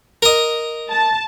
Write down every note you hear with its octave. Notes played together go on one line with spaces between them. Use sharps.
A#4 D#5
A5